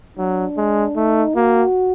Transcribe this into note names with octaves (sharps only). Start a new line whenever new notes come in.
F#3 D4
G#3
A3 D#4
A#3 F#4